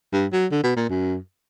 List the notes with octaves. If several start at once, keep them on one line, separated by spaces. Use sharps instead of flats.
G2
F#3
D3
B2
A#2
F#2